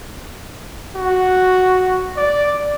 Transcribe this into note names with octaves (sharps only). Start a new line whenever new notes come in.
F#4
D5